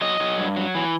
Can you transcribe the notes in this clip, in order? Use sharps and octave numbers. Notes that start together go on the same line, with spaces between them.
F#3 D#5
F#3
G2
F#3
E3